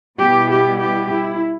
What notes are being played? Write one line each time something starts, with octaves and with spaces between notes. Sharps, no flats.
B2 G3 B3 E4 G4
G4
G4
E4